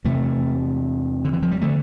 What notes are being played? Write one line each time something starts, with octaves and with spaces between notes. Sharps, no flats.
E2 C3 A3
D3
E3
F3
G3
D3 A3